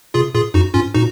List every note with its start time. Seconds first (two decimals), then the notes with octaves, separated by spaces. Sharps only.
0.14 C3 F4 G#4
0.34 A#2 F4 G#4
0.54 F#2 D#4 F#4
0.74 G#2 C#4 F4
0.94 A#2 D#4 F#4